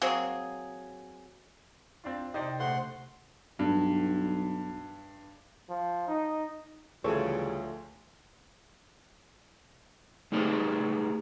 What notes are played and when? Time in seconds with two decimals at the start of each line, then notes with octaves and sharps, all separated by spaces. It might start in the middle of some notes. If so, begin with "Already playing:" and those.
0.02 F#3 A#3 C4 G#4
2.04 C4 D4 F4
2.34 C3 D#4 C5 D5 G5
2.60 A#1 A3 C5 F#5 C6
3.59 B1 G2
5.69 F3
6.08 D#4
7.04 D2 C#3 E3 F3 G3 G#4 A4 C#5
10.32 A3 D#4 G4 G#4 B4 C5